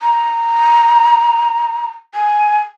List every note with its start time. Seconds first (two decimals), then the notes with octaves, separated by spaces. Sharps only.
0.01 A#5
2.15 G#5